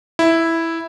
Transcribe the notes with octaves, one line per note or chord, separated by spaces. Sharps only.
E4